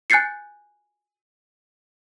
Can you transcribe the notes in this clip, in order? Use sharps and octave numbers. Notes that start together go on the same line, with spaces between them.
G#5 F#6 G6 A6 C7 C#7